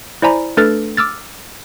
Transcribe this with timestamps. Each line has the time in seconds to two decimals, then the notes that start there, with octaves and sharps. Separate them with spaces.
0.22 E4 C5 D5 G#5 A#5 B5
0.57 A3 D4 A4 B4 F6 A6
0.97 D6 E6 F6 A6